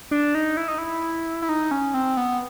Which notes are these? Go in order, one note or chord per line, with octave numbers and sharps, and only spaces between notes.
D4
D#4
E4
D#4
E4
E4
D#4
C#4
C4
B3